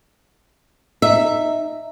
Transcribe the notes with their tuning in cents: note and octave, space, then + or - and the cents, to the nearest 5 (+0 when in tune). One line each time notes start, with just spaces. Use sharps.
D#4 -10 E5 +0